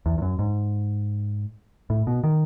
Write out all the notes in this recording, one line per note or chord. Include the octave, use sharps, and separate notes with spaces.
E2
E2
F#2
G#2
A2
B2
D#3